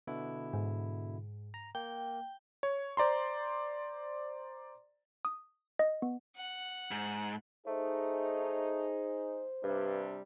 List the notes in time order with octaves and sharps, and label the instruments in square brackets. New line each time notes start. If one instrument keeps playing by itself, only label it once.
[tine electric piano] B2 D3 E4
[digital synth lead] G#2
[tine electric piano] A#5
[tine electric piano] A#3 [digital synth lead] G5
[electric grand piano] C#5
C5 D5 A#5 C6
[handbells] D#6
D#5
B3
[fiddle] F#5
[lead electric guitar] G#2
[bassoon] A3 [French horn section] D#4 G#4 [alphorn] C5
[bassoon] G2 [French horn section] C3 G3 D4